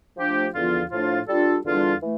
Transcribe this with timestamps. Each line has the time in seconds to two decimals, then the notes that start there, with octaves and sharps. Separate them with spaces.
0.17 F3 A3 D4 G4
0.53 E2 D3 F3 B3 F4
0.90 A2 F3 A3 D4 F4
1.28 G3 D4 F4 A4
1.64 E2 D3 G3 D4 F4
2.02 E3 A3